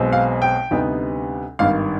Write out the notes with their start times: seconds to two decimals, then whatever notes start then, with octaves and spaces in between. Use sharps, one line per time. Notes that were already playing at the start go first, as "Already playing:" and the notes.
Already playing: B1 B2 G#3 C4
0.12 F5
0.42 G5
0.71 D2 C3 G3 B3 D#4
1.59 G#1 G2 D#3 F5